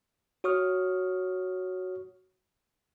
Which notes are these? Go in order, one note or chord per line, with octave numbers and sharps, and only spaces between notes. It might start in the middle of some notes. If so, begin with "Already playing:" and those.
F#4 C#5 C#6 D#6 F6